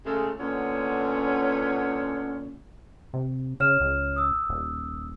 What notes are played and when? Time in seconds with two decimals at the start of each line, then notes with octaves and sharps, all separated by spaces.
0.06 C#3 G#3 A3 F4 G#4 A4
0.39 A#2 D3 B3 C#4
3.14 C3
3.60 C#3 C#5 F6 E7
3.81 C#2
4.16 D#6 E6
4.50 D#1